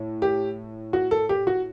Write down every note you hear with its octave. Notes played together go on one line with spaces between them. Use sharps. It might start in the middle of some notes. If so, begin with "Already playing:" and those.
Already playing: A2
G4
F#4
A4
G4
F#4